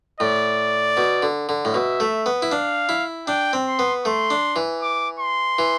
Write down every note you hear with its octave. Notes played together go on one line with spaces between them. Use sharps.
A2 D5
B2
D3
D3
A2
B2 E5
A3
B3
E4
D4 F5
E4
D4 G5
C4
C6
B3
A3 C6
D4
E3
D6
C6
E3